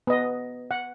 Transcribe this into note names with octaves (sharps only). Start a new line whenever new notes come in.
B3 D#5
F#5